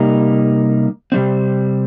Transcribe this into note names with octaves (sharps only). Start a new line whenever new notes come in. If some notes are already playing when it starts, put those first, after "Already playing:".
Already playing: C3 G3 A#3 D#4
C3 G3 C4